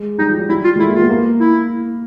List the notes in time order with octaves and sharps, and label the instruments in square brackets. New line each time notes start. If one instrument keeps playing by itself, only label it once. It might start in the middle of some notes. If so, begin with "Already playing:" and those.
Already playing: [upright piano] G#3
[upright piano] G3 [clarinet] D#4
[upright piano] F3
F#3
[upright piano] G3 [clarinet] E4
[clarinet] F4
[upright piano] G#3
[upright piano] A3 [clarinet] E4
[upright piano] A#3
[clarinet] F4
[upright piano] B3
A#3
[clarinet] E4